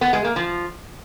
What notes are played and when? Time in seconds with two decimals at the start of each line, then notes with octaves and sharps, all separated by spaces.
0.01 B3
0.13 G#3
0.24 A#3
0.36 F3